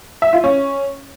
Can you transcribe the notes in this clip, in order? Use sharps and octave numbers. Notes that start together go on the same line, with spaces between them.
E5
F4
C#4